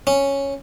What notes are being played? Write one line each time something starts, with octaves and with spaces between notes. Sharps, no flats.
C#4